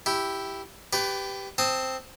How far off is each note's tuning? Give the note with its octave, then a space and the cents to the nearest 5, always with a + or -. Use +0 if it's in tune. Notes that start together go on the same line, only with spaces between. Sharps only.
E4 +0 G4 +0
G4 +0 B4 +20 D5 -20
C4 +0 A5 +0 D#6 +0